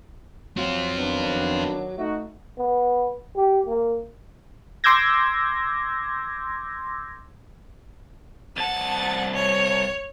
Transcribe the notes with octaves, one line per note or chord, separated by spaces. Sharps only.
F#3 C4 F4
D#3 B3 D4
A3 D#4 F#4
B3
G4
A#3
C6 D6 E6 G6 G#6 A#6
C2 F#5 A5 A6
C#5